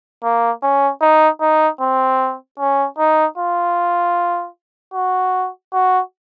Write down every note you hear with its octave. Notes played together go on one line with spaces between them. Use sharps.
A#3
C#4
D#4
D#4
C4
C#4
D#4
F4
F#4
F#4